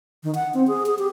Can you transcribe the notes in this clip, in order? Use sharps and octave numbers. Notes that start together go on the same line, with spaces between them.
D#3
F#5
C4
G#4
G#4
G4